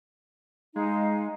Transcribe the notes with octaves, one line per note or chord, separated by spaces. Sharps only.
G#3 D#4 F5